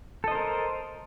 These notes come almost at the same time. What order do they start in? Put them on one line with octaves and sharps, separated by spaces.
A4 D#5 C5 A#4